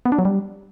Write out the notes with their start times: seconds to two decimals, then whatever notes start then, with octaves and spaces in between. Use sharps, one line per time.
0.05 B3
0.12 D4
0.19 F#3
0.25 G3